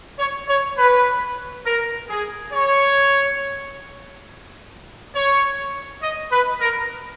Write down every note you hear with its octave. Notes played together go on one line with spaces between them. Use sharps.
C#5
C#5
B4
A#4
G#4
C#5
C#5
D#5
B4
A#4